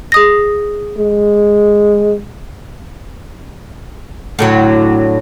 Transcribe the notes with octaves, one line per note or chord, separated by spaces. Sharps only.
G#4 D#6 A#6
G#3
A2 D3 F#3